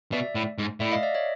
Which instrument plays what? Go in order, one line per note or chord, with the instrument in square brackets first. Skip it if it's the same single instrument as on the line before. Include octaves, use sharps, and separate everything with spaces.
[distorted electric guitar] B2 [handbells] D5 E5
[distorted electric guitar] A2
G#2
[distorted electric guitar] A2 [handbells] D5 E5
[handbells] D#5 F5
D5 E5
C#5 D#5